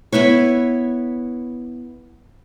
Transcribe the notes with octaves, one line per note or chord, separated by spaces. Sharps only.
B3 E4 B4 C#5